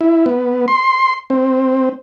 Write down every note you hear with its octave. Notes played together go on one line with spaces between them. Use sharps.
E4
B3
C6
C4